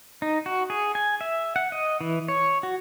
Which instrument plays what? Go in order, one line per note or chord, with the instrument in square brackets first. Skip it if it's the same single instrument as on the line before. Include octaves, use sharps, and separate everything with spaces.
[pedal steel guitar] D#4
F#4
G#4
G#5
E5
F#5
D#5
E3
C#5
F#4